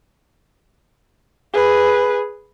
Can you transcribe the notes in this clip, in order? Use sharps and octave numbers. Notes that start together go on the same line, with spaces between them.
G#4 B4